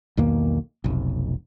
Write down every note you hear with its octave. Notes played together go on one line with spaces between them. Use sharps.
B1 E2 D#3 A#3
F1 B1